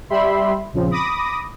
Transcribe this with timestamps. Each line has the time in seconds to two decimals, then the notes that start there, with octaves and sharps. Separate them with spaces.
0.10 G3 G4 E5 B5 C6
0.73 A#1 C#3 F3 C4
0.91 B5 D6 D#6 A#6